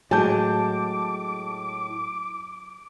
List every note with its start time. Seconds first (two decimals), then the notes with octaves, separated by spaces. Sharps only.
0.11 A2 F#3 G#3 G#4 A5 D6 G6